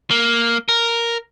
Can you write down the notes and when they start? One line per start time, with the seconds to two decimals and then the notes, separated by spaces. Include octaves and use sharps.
0.11 A#3
0.69 A#4